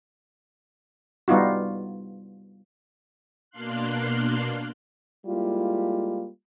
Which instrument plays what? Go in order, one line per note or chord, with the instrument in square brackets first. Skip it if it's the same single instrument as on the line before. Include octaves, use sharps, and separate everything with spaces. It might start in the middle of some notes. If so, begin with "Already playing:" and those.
[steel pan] G3 B3 D#4 F4 F#4
[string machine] B2 A#3 D4 F5 C6 F#6
[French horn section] G3 G#3 A#3 E4 F4